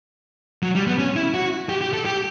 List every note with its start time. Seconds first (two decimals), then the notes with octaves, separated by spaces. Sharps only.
0.63 F#3
0.75 G3
0.87 B3
0.98 C#4
1.16 E4
1.34 F#4
1.69 G4
1.81 G4
1.93 A4
2.05 G4